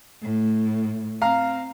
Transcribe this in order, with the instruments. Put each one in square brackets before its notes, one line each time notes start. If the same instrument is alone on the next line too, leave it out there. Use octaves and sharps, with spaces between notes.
[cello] A2
[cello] C4 [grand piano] F5 A#5